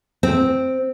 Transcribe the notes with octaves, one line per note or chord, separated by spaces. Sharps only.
C4